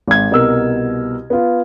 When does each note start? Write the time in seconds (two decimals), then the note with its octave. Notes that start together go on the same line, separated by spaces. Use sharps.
0.08 G#1 G#6
0.31 C2 B2 A#4 E6
1.30 B3 F4